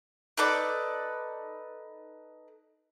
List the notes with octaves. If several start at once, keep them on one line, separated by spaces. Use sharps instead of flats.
D#4 A4 B4 D5